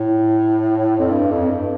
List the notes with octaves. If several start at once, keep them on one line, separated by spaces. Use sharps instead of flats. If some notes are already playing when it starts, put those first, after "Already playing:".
Already playing: A2
F2
G2
F2
G2